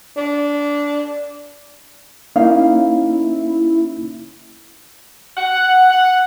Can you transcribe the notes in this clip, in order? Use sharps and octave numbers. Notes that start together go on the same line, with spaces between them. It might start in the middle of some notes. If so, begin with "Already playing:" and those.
D4
A#3 C#4 D#4 E4 F5
F#5
F#5